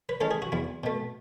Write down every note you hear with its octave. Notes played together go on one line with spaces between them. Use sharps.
B4
E3 G#3 C#4 A4
G#4
F#4
E2 E4
B2 A3